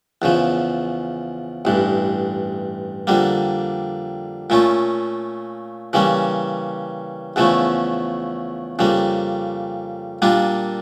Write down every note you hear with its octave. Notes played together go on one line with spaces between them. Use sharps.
E2 C#3 F3
A1 G2 E3
F2 D3 G3 A#3
A#2 A3 C#4 F4
C#3 E3 G3 A#3 C#4
E2 C#3 F3 A3 C#4
F2 C#3 G3 A#3
A#2 G3 A#3 D4 F4